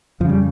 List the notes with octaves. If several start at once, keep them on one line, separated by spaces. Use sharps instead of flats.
F2 C#3 F3
G3